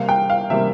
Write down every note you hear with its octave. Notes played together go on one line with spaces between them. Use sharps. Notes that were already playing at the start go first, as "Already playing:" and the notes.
Already playing: C3 G3 A#3 F5
G5
F5
C3 G3 A#3 E5